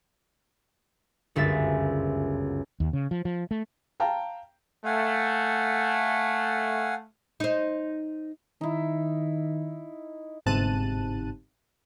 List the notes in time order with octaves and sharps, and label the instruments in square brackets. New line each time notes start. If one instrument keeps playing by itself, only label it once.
[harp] G1 C#2 F#2 E5 A6
[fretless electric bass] D#2
C#3
F3
F3
A3
[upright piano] F5 G5 A5 A#5
[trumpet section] A3 [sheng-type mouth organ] F5 F#5 G#5
[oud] D#4 C5
[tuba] D#3 [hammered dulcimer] D#4 E4
[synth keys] G1 G#2 C3 A5 F#6 D#7